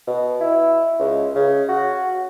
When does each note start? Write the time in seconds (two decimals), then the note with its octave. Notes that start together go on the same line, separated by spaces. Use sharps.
0.07 B2
0.41 E4
0.99 C#2
1.35 C#3
1.69 F#4